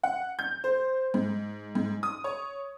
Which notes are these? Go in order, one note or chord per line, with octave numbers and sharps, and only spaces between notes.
F#5
G6
C5
G#2
G#2
D#6
C#5